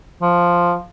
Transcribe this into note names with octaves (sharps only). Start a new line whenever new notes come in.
F3